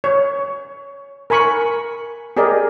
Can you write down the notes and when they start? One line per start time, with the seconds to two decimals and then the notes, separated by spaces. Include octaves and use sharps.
0.04 C#5
1.30 A#4 G#5 B5 C#6
2.37 G4 G#4 A#4 D5 D#5